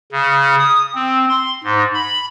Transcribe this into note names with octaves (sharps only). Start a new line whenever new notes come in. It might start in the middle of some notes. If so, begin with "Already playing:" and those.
C#3
D#6
C4
C6
G#2
B5